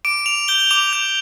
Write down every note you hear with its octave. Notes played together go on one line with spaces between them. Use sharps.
D6 D7
D6 F7
G6 G7
D6 F7
G6 F7